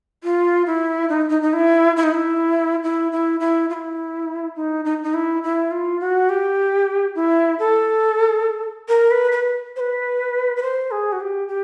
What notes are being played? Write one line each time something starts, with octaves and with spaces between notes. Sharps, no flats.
F4
E4
D#4
D#4
D#4
E4
E4
D#4
E4
E4
E4
E4
F4
E4
D#4
D#4
D#4
E4
E4
F4
F#4
G4
E4
A4
A#4
B4
B4
C5
B4
B4
C5
G#4
F#4
G4
G4